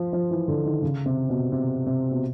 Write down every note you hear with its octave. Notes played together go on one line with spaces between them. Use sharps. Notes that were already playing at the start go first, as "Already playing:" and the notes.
Already playing: F3
F3
E3
D3
D#3
C#3
C3
B2
C3
C3
B2